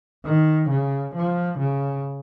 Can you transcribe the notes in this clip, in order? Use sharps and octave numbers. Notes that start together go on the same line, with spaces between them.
D#3
C#3
F3
C#3